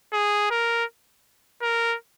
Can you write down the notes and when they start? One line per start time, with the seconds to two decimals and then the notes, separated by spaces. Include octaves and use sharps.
0.13 G#4
0.51 A#4
1.62 A#4